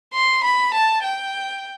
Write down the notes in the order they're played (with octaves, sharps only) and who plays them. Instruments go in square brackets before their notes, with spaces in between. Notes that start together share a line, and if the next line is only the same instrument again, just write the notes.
[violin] C6
B5
A5
G5